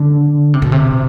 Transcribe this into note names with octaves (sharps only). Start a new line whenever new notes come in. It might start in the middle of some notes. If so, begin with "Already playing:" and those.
Already playing: D3
C3
B2
C3